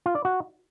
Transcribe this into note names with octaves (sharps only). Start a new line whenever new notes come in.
F4
D5
F#4